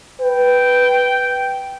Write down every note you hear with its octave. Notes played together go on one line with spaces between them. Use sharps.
B4 G5